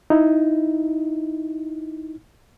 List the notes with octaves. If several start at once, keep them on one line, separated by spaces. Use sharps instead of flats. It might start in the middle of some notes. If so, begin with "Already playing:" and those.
D#4 E4